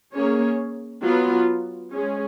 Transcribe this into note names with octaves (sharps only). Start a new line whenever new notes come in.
A#3 C#4 G#4 C#5
F#3 B3 F4
G#3 C#4 G#4